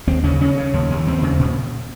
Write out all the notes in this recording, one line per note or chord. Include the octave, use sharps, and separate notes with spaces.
D#2 C4
C#3 C#4
C#3 C#4
C#3
D#2
D#2
D#2 C4
C#3
A#2